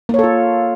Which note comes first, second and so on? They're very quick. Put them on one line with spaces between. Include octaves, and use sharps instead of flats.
A#3 C#5 A4 F4